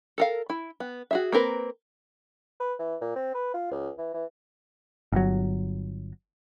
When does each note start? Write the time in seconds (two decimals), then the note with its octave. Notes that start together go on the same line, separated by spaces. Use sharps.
0.18 A4 A#4 F5
0.50 E4
0.80 B3
1.11 F#4 G#4 E5
1.32 A#3 C4 A#4 B4
2.60 B4
2.79 E3
3.01 A#2
3.15 C4
3.34 B4
3.54 F4
3.71 C#2
3.98 E3
4.14 E3
5.12 G1 F#3